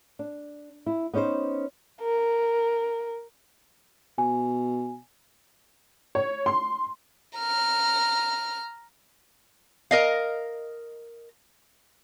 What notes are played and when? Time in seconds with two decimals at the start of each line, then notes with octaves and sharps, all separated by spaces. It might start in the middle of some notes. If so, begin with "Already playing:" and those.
0.19 D4
0.86 E4
1.14 B3 C#4 D#4 B4 C5
2.01 A#4
4.18 B2 G#5
6.15 C#5
6.46 C6
7.38 A#5 F6
9.91 A#4 D#5 F5